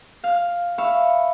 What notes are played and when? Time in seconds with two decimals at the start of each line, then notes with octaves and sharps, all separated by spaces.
0.24 F5 F6
0.78 E5 F5 B5 C#6